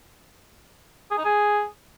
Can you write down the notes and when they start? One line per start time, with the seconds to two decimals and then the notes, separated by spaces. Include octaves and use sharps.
1.11 G#4
1.18 D#4
1.25 G#4